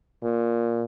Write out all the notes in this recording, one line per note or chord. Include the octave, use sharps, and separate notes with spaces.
A#2